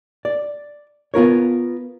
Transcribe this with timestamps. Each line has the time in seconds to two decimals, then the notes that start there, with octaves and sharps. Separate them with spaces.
0.25 D5
1.14 B3 F4 A#4 C#5